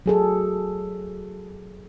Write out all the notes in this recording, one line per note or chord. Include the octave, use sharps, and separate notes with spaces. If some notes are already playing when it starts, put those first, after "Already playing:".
F#3 G#4 A4